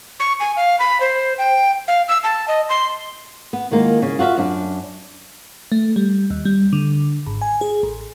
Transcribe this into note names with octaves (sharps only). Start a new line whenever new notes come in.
C#6
G#5
F5
B5
C5
G5
F5
E6
A5
D#5
C6
B3
D#3 G#3 A#3 F4
C#3
F4 F#4 G#4 E5 F5
F#2 D4
A3
G3
D#2
G3
D3
G#1
G#5
G#4
A1